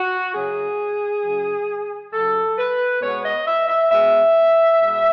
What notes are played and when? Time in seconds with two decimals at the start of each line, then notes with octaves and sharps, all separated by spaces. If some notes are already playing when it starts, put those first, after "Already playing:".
Already playing: F#4
0.34 F#2 C#3 F#3 G#4
1.24 F#2 C#3 F#3
2.12 F#2 C#3 F#3 A4
2.57 B4
3.02 B2 G#3 B3 C#5
3.24 D#5
3.46 E5
3.68 E5
3.90 B2 G#3 B3 E5
4.79 B2 G#3 B3